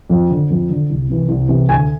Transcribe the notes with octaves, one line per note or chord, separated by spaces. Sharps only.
F2
D3
F2
D3
C2
C3 E3
C2
C3 E3
D2 G#5